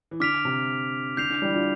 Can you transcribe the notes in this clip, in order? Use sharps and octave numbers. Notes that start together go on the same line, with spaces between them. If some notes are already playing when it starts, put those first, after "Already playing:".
E3
D3 D6 F6 B6 D7 F7
C3
D3 G6 C7 F7
D3
E3 G3
D4 F4